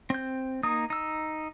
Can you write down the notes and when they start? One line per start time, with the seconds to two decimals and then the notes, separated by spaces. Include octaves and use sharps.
0.10 C4 G6
0.63 A#3 D#4 D#6
0.90 D#4 E6